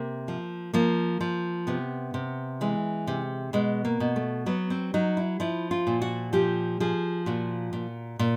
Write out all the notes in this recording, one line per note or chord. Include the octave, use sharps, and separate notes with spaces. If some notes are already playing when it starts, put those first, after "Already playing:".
Already playing: C3 A#3
F3
F3 A#3
F3
C3 B3
C3
E3 G#3
C3
B2 G#3
A#3
B2
A3
F#3 B3
C4
F#3 D#4
E4
F3 E4
F4
A#2
F#4
F3 G4
F3 G#4
A#2 F#4
A#2
A#2